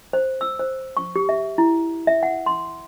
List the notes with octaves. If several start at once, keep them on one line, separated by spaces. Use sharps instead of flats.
C5
E6
C5
C#6
G4
E5
E4
E5
F#5
C6